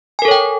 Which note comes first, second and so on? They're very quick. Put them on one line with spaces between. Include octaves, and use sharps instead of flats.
G#5 A#4 A4 C#5 G5